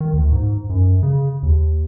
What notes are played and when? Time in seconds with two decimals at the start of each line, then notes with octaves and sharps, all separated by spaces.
0.01 D#3
0.13 D2
0.32 G#2
0.70 F#2
1.03 C#3
1.43 D#2